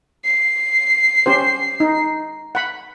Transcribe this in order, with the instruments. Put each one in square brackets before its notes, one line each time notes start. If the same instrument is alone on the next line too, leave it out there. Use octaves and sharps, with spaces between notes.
[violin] C7
[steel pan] C#4 G4 C5
D#4
F#5 B5